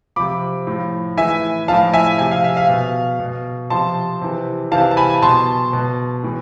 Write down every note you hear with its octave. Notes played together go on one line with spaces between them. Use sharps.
C3 F3 B5 D6
A2 F3
A2 E3 E5 G#5
A2 F3 F5 A5
E5 G#5
C3 F3 G#5
F5
E5
F5
B2
B2
C3 F3 A5 C6
C3 E3
C3 E3 F5 A5
A5
G#5 B5
B2 A5 C6
B2
A2 E3